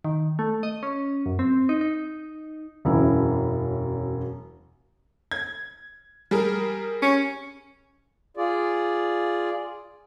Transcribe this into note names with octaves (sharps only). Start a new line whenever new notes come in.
D#3
A3
D#5
C#4
F#2
C4
D#4
D#4
E1 F#2 E4
G#6
G3 G#4 A#4
C#4
F4 G#4 D5